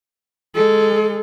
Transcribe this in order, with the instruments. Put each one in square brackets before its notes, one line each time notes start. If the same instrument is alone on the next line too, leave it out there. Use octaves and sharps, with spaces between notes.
[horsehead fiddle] G#3 A4